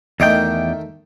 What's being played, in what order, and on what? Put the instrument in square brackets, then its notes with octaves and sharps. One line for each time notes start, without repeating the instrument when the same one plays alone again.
[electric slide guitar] E2 D5 G5 [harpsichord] D#3 A3 D#5